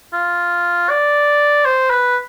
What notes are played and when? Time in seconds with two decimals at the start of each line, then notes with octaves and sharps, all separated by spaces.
0.13 F4
0.89 D5
1.65 C5
1.90 B4